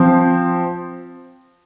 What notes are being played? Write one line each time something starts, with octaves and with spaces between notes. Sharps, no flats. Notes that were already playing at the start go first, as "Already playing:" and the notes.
Already playing: F3 C4